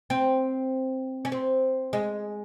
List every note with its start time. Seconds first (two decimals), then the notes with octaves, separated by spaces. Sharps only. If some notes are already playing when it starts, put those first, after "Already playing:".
0.10 C4
1.25 C#4
1.32 C4
1.93 G#3